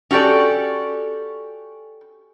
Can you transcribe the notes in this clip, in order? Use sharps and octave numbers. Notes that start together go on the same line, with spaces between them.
C#4 F#4 G4 A4 D5